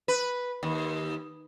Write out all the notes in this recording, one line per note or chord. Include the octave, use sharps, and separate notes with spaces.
B4
D#2